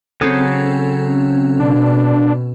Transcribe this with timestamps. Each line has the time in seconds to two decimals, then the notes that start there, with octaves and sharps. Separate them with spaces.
0.21 C#3 F#3 C4 C#4 A4 D#6
1.59 B2 D4